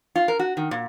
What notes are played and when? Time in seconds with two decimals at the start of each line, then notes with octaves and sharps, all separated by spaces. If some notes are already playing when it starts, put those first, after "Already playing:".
0.16 F4
0.28 A#4
0.39 F#4
0.57 D#3
0.71 A#2